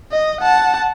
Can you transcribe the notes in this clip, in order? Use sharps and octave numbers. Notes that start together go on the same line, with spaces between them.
D#5
F#5 A5